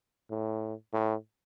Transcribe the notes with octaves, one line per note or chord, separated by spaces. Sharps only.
A2
A2